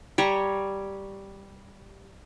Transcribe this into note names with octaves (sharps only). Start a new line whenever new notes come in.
G3 C#5 A#5